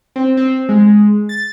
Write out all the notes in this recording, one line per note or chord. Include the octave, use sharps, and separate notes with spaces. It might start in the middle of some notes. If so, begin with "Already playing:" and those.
C4
C4
G#3
A6